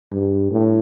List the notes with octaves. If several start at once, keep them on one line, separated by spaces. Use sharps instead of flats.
G2
A2